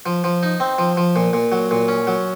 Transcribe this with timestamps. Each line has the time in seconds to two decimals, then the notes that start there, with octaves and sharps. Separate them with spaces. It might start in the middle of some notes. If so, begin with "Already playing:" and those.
0.06 F3
0.24 F3
0.43 D#4
0.60 C4
0.78 F3
0.97 F3
1.16 A#2
1.33 A#2
1.52 F#3
1.71 A#2
1.88 C#4
2.07 F#3